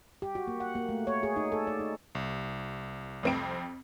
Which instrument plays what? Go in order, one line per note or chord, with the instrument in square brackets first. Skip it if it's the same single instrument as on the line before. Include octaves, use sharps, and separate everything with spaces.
[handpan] G4
F#4
A#3
F#5
A#3
A3
C#5
G#4
D#4
A4
D5
D#4
[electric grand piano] C2
[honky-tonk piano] F2 C4 D7